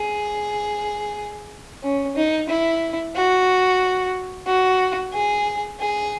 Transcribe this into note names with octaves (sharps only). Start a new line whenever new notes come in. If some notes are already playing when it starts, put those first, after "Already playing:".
Already playing: G#4
C#4
D#4
E4
F#4
F#4
G#4
G#4